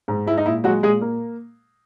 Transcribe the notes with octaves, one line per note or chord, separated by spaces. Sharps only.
G#2
G#3 E4
D#4
A#2 E4
F#3 G#3 F#4
A#2 G#3 G#4
A#3